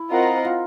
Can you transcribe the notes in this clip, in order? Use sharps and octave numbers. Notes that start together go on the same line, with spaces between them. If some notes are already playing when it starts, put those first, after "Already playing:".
Already playing: E4
C4 F4 A#4 D#5 F#5
F4